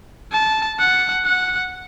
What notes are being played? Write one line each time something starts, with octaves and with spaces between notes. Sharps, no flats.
A5
F#5
F#5